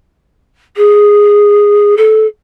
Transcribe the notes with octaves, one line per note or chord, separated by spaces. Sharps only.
G#4
A4